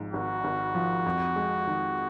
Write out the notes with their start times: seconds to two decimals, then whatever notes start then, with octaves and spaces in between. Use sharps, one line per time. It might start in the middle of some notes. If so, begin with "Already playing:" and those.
Already playing: G#1 G#2 F3
0.13 G#1 F#4
0.44 G#1
0.75 F3
1.06 F2
1.36 G#3
1.67 D#3